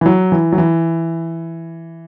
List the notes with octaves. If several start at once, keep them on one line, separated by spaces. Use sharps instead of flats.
E3
F#3
E3
F#3
E3